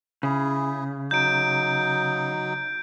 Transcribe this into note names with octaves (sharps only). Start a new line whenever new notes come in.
C#3 E4 G#4
F#3 D#4 G6 D7